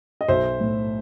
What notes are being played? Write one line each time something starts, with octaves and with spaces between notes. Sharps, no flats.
D#5
B1 C5 E5
A2